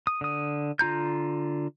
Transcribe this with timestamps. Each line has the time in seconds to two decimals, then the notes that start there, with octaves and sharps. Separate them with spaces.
0.07 D#6
0.21 D3 D#6
0.79 D3 F4 A#5 G6